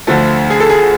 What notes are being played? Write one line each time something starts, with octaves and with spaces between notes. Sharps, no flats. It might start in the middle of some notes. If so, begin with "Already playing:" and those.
D2 D3 F3 A3
G#4
A4
G#4